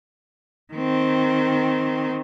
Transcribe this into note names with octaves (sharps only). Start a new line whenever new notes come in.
D#3 C4